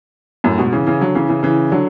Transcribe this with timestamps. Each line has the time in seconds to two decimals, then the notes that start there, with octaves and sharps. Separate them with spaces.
0.44 F#2 A2
0.58 G#2 B2
0.72 C#3 E3
0.87 C#3 E3
1.01 D3 F#3
1.15 C#3 E3
1.29 C#3 E3
1.43 C#3 E3
1.72 D3 F#3